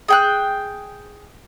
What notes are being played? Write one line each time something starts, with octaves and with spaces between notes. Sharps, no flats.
G#4 G5 F#6